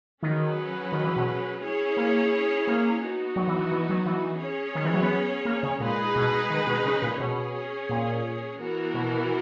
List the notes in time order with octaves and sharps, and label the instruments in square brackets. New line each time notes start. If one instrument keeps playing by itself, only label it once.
[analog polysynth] D#3 [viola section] F#3 C#4 G#4 B4
[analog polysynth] D#3
E3
B2
[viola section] C#4 E4 G#4 C#5
[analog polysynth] A#3
A#3
[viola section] B3 D#4 F#4
[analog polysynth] F#3
E3
E3
E3
F#3
E3
[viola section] C#4 G#4 C#5
[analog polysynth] D#3
E3
F#3
B3
A#3
C#3
[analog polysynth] A#2 [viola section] G#3 D#4 G#4 B4
[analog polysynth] B2
D#3
B2
C#3
A#2
[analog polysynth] B2 [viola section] C#4 G#4 C#5
[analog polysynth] A#2
[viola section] E3 B3 F#4 A#4
[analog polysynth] B2